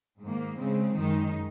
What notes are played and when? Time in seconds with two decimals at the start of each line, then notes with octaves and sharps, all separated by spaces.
0.22 G#2 D#3 A#3
0.58 C#3 G#3 C4
0.94 F#2 D#3 G#3 D#4